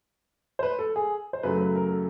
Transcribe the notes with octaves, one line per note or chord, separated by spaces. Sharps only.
C5
B4
A4
G#4
C5
F#2 C#3 F#3 A3 B4
B4
A#4
A4